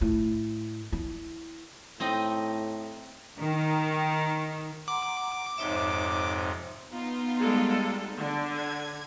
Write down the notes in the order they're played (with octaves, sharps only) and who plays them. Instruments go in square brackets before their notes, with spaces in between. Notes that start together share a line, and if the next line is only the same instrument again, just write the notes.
[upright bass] A2
E4
[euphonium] A2 [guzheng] C4 D#4 D#5
[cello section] D#3
[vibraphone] F#5 A#5 C6 [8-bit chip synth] D6
[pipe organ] F2 G#2 C3 [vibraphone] D#4 C#5 E5
[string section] B3 D#4 F4
[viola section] G3 G#3 A4
D3
[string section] G#6